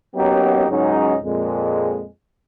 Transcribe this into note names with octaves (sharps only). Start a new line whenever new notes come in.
F#3 A#3 B3 C#4 D#4 G4
C#2 G#2 F#3 C#4 D#4
F2 A#2 G#3